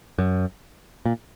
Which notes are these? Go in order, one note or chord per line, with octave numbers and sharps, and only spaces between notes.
F#2
A#2